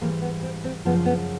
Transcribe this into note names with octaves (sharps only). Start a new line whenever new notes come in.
G#2 E3 G3 A#3
B3
C4
C4
F#2 C#3 F3 G#3 B3
B3